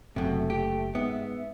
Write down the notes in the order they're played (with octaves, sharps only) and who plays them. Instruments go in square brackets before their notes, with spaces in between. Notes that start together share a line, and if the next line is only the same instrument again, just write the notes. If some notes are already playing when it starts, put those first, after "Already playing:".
[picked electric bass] F#1 [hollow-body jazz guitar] F#2 C3 [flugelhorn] A3
[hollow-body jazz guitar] G4
[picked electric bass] G#2 [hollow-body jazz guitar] B3 [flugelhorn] E5